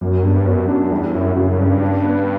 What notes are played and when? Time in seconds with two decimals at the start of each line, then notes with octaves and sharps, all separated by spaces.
0.01 F#2 A#3
0.24 G2 B2
0.46 F#2 B2
0.68 F#2 D4
0.91 E2 G3
1.14 F#2 E4
1.36 F#2 C#3
1.58 G2 C#4
1.81 D4
2.04 B3